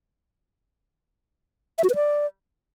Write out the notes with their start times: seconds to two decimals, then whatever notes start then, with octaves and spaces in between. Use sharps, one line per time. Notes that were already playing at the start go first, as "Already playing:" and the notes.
1.78 E5
1.84 F#4
1.90 B4
1.95 D5